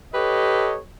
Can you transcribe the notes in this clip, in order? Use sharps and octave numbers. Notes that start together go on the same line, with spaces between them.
G4 A4 B4 C#5 D#5